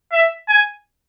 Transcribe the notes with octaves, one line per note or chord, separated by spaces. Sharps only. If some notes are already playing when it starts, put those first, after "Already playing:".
E5
G#5